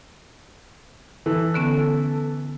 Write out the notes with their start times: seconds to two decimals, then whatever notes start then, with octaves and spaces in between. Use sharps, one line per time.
1.26 E3 A4
1.54 D3 B3 C#4